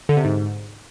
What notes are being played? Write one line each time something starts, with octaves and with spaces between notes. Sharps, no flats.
D3
C3
G#2